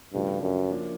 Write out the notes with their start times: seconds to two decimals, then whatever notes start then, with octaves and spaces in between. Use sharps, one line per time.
0.14 G2 C#3 F3 A3 D4 F#4
0.42 F#2
0.71 F3 A#3 D4